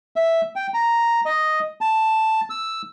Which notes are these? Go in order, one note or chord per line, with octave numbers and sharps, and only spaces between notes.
E5
G5
A#5
D#5
A5
E6